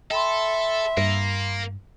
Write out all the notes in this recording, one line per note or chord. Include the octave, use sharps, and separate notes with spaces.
A4 E5 G5 B5 C6
G2 A#3